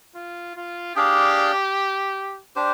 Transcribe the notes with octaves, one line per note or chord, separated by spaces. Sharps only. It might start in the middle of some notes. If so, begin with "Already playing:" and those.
F4
F4
D4 G4 G#4 D5 F5
D4 G4 C5